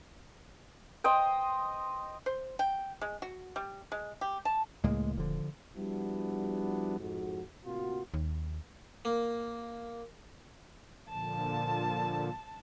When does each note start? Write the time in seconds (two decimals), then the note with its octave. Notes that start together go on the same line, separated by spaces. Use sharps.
1.04 C5 D#5 G5
2.26 C5
2.59 G5
3.01 G#3
3.22 F#4
3.56 G3
3.92 G#3
4.21 G4
4.45 A5
4.84 C#2 A2 G#3 A#3
5.17 D#1 D3 F3
5.77 F3 G3 B3 D4 E4 F#4
6.99 F2 G#2 F#4
7.65 A2 C3 A#3 F4 F#4
8.14 D#2
9.05 A#3
11.09 A#2 D3 F3 A5